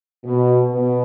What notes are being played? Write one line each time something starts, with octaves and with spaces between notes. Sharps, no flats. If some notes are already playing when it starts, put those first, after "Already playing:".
B2
B2